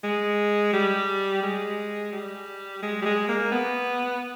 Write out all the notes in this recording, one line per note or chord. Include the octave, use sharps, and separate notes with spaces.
G#3
G3
G#3
G3
G#3
G3
G#3
A#3
B3